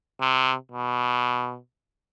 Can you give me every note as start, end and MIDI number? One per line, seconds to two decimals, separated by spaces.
0.21 0.55 48
0.72 1.58 47